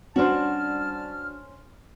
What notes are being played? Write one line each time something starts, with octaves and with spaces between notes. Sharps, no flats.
G3 C#4 D4 F#4 C5 A5 C6 F6